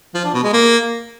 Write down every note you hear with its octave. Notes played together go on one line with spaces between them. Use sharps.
F3
D4
B2
G#3
A#3